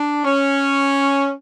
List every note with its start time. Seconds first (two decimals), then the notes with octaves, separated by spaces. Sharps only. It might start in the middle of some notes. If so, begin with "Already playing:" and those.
Already playing: D4
0.24 C#4